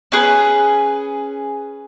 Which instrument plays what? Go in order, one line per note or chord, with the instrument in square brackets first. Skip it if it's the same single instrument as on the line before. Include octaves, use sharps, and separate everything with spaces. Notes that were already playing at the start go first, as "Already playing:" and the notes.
[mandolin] C#4 G#4 B4